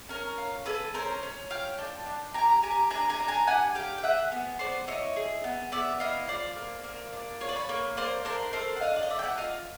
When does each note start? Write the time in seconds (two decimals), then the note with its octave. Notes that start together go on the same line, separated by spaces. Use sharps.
0.09 C#4 A#4
0.38 F4
0.66 G#4 A4 B4
0.94 C#4 A#4 C5
1.23 C#4
1.50 F4 F5 G5
1.78 D4 G5 A5
2.06 D4
2.34 G4 G#5 A#5
2.62 G4 G#5 A#5
2.90 D4 G#5 A#5
3.09 G#5 A#5
3.20 D4
3.28 G#5 A#5
3.47 G4 F#5 G#5
3.75 G4 F5 G5
3.98 G5
4.03 G#4 E5 F#5
4.32 B3
4.59 B3 C5 D5
4.88 E4 C#5 D#5
5.16 G#4
5.44 B3
5.72 B3 D5 E5
6.00 E4 D#5 F5
6.28 F4 C5 D5
6.56 A#3
6.84 A#3
7.13 D4
7.41 F4 C#5
7.49 D5
7.56 B4 C#5
7.69 A#3
7.97 A#3 C5 D5
8.25 D4 A#4 C5
8.53 A4 A#4 C5
8.77 F#5
8.81 D4 D#5 F5
8.96 D5
9.03 D#5
9.10 D4 D5 E5
9.19 G5
9.23 E5 F#5
9.37 F4 D#5 F5